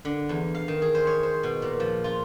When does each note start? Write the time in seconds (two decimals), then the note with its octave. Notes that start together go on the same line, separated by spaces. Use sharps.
0.05 D3
0.29 E2
0.55 F5
0.68 D#3
0.82 G#4
0.95 C5
1.07 C#5
1.23 C5
1.43 B2
1.62 A#2
1.80 F3
2.04 F4